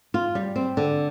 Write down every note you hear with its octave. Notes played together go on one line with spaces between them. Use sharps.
F4
G3
C4
D3